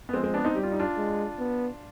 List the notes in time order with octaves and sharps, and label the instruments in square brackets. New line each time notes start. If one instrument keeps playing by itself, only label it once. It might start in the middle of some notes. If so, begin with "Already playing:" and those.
[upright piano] B3
[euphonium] F3 [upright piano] G#3 C4
[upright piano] G#3 C4
B3 D4
C4 D#4
[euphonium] G3 [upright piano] G4
[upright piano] F4
D#4
D4 F4
[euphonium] G#3
B3